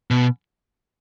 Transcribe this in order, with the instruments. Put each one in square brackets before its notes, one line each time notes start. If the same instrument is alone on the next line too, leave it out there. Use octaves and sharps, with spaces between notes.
[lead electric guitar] B2